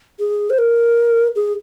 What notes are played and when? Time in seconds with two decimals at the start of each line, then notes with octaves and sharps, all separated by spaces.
0.20 G#4
0.50 C5
0.58 A#4
1.36 G#4